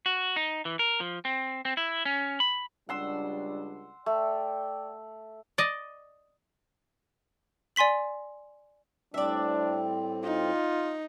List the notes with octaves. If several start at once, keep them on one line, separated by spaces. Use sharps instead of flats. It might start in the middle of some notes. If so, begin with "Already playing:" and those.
F#4
D#4
E3
A#4
F3
C4
C4
E4
C#4
B5
C#2 G3 D4 F#5 C6 E6
A3 D5 G5
D5 D#5
D5 G#5 C6 B6 F#7
A2 G3 C4 D4 D5 E5
D#4 F4